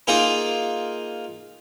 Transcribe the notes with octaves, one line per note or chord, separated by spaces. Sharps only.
A#3 D#4 F4 G#4 A#4